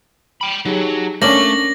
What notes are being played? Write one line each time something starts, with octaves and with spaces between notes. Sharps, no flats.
G5 B5
F#3 D#4 G4 G#4
A3 A#3 C#4 D4 D6 A#6 F#7